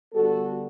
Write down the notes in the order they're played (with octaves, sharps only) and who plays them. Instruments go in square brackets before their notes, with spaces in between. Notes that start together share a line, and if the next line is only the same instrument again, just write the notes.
[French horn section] D3 G3 B3 F#4 A4